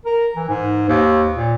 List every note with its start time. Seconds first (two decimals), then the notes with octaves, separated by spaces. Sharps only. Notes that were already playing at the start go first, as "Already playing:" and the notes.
0.05 A#4
0.36 E3
0.49 G#2
0.88 D#2
1.36 A#2